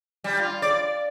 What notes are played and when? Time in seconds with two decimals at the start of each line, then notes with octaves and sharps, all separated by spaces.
0.24 G3
0.39 F4
0.62 D5